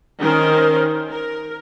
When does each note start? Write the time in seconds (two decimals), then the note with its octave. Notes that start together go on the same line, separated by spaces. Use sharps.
0.19 D#3 C#4 A#4 C5
1.09 A#4